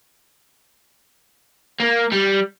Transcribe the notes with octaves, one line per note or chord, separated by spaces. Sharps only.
A#3
G3